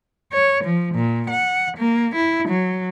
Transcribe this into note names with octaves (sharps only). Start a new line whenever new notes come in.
C#5
F3
A#2
F#5
A#3
E4
F#3